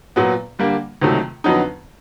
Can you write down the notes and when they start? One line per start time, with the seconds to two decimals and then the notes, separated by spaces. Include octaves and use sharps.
0.16 A#2 F#3 B3
0.59 D3 G3 A#3
1.01 C#2 C3 D#3 F#3 A3
1.44 F2 D3 F#3 B3 D#4